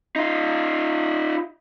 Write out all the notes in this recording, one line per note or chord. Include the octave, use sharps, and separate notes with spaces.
D#4 F4